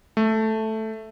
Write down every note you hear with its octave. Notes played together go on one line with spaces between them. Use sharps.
A3